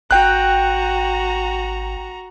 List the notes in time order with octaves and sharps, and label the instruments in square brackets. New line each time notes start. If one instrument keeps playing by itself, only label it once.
[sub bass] G#1 [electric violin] F#4 A#5 [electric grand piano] G5 F#6